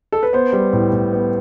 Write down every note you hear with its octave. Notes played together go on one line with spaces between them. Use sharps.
A4
B4
B3 C5
G3
A2
A2
B3